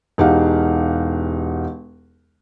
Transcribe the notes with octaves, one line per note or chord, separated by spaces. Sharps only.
E1 D#4 G4 F5 F#5